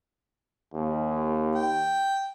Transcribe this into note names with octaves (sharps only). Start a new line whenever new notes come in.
D#2
G5